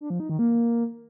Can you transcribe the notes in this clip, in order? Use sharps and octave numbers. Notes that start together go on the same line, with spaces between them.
D4
F3
D#4
D#3
A#3